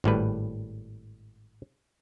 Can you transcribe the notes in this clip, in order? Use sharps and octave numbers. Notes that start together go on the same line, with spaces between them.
G#1 A2 G3 B4